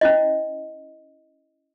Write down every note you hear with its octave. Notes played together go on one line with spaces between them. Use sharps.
C#4 E4 D#5